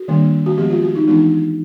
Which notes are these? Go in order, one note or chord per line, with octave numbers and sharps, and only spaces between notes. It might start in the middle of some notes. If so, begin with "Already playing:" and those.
Already playing: F#4
D#3 G3 A#3 D4
F#4
F3 G#3 B3 G4
F4
F#4
D#4
E3 G#3 B3 D4 D#4